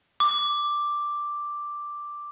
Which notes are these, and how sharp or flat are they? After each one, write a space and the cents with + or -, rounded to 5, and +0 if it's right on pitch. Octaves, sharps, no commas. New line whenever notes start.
D6 +0